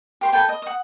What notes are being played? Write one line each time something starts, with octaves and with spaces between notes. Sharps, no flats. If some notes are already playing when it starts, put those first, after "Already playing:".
G4 C5 C6
A4 B4 G5 G#5
D#5
F#5 D#6